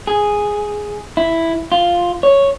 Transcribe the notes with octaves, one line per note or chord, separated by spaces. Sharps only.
G#4
E4
F4
C#5